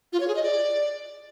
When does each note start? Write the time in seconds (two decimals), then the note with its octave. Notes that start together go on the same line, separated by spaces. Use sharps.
0.13 F4
0.20 C#5
0.28 G#4
0.36 D#5
0.43 D5